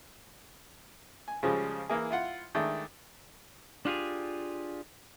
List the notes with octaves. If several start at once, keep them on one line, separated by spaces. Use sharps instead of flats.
G#5
C#3 F3 G3 G#3
E3 A#3 E4 G#4
E4 F4 F#5
D#3 G#3 A3 D4 E4
D4 F4 G4 G#4